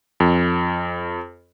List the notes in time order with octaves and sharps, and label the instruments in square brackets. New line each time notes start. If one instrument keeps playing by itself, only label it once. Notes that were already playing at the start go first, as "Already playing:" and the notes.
[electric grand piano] F2